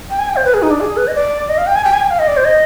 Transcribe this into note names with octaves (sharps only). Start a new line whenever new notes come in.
G5
G#5
G5
C5
B4
G#4
D#4
D4
G#4
B4
D#5
D5
D#5
F5
G5
G#5
G5
G#5
G5
F5
D#5
D5
C5
D#5